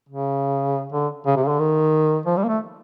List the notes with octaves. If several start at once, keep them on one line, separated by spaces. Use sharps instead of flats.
C#3
D3
C#3
C3
C#3
D3
D#3
F3
G3
A#3
A3